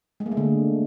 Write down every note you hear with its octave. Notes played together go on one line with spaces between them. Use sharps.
G#3
A#3
A3
D3